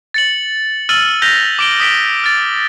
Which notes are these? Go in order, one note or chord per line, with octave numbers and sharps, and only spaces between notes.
A6 C#7 F#7
E6 F6 A6 D#7 F#7
F6 G6 A#6 B6 F7 G7
D6 D7 G7
D#6 B6 D7 G7
F6 A6